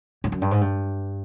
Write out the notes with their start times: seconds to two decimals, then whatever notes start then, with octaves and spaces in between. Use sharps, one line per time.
0.24 G#2
0.32 F#2
0.42 G2
0.51 G#2
0.61 G2